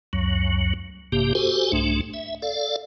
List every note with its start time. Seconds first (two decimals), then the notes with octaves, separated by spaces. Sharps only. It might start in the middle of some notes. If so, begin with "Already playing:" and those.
0.13 C#2 F#2 F#3
1.12 A1 G2 C3 A#3 G4
1.35 F#4 G4 A4 C5 G#5
1.72 C2 G#2 A3 D4
2.14 E5
2.42 A4 D5 F5